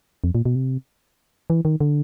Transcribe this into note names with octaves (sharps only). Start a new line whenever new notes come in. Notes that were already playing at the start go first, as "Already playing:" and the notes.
F2
A#2
B2
C3
E3
D#3
D3